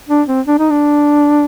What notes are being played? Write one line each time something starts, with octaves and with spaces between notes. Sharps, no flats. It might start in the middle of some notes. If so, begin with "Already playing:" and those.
D4
C4
D4
D#4
D4